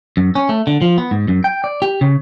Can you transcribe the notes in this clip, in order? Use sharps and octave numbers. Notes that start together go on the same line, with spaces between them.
F#2
C#4
A3
D3
F3
B3
G#2
F#2
G5
D5
G4
C#3